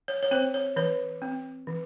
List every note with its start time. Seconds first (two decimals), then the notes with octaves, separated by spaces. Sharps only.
0.08 C#5
0.23 C#5
0.31 C4 C5
0.54 C#5
0.76 E3 C#5
1.22 C4
1.67 E3